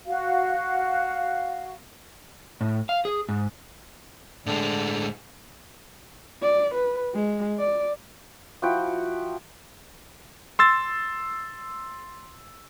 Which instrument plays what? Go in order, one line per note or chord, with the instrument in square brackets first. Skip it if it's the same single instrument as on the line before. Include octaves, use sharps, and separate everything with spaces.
[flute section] F#4 F5
[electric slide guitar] A2
F5
G#4
G#2
[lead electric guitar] A2 G#3 [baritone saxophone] D3
[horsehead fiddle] D5
B4
G#3
D5
[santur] F3 E4 F#4 G5
[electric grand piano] C6 E6 A6